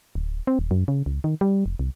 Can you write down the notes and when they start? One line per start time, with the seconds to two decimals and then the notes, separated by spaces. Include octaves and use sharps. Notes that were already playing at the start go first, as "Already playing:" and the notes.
0.15 D1
0.47 C4
0.59 D#1
0.71 F#2
0.88 C#3
1.06 C#2
1.24 D#3
1.41 G3
1.66 F1
1.79 C2